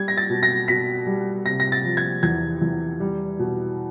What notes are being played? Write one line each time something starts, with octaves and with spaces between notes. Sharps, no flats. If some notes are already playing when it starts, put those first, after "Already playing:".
Already playing: G3 G#6
A#6
A6
B2
A#6
B2 B6
G3
C3 A#6
A#6
A6
F3
G#6
E2 G#6
E2
G3
B2